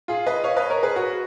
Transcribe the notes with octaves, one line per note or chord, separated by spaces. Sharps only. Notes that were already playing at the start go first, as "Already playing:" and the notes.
F4 G#4
B4 D#5
C#5 F5
B4 D#5
A#4 C#5
G#4 B4
F#4